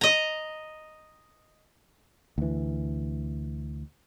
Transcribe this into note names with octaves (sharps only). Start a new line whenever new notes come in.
D#5 A#5
D2 E3